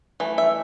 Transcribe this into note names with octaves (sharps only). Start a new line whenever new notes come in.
E3 A3
E5